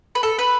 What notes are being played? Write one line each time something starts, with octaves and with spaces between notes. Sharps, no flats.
B4
A4
B4